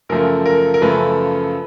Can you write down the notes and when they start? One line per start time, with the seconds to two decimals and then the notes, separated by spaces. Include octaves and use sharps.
0.09 F#2 C#3 F3 A3 A#4
0.46 A#4
0.74 A#4
0.82 F#2 C#3 F3 A3 B4